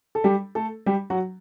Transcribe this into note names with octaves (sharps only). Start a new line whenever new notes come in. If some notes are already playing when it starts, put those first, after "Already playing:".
A4
G3 G4
A3 A4
G3 G4
F#3 F#4